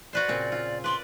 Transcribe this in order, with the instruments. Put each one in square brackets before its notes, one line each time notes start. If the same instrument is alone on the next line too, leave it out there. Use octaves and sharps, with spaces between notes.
[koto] F#4 B4 C5 [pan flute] D5
[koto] A#2 C#3 C4
F4
[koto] B4 D5 [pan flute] C6